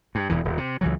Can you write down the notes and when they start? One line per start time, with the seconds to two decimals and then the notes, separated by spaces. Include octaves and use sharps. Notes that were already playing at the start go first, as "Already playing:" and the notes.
0.15 G2
0.29 E1 E2 E3
0.45 D#1
0.57 C3
0.81 C#2 E3 F#3